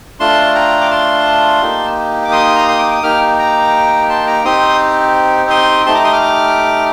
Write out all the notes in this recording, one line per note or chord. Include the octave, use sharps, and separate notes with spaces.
A3 D4 F4 A5 C6
G5 A#5
D6
A5 C6
A#3 D#4 G4
D6
C6 D#6
A#5
C6
D6
D#6
A#3 D#4 G4 D6 F6
A#5 D6
A5 C6
A#5 D6
C4 D#4 G4 C6 D#6
C6 D#6
A3 D#4 G4 A5 C6
A#5 D6
C6 D#6
D6 F6